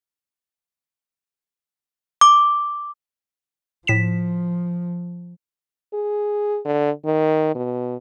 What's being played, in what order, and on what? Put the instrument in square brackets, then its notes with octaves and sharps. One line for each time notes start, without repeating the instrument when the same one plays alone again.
[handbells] D6
[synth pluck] A2 B6 E7 [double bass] F3
[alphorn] G#4
D3
D#3
B2